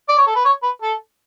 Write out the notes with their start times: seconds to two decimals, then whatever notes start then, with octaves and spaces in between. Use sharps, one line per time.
0.09 D5
0.18 C#5
0.27 A4
0.36 B4
0.45 C#5
0.63 B4
0.82 A4